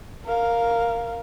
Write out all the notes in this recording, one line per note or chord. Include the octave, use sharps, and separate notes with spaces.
A#4 F5